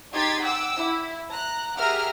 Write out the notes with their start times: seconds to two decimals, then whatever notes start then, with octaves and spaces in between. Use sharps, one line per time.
0.12 D#4 G4 C6 G#6 A6 B6
0.41 F#5 G5 D6 E6
0.77 E4
1.31 A#5 F#6
1.77 G4 G#4 A#4 E5 F#5 F6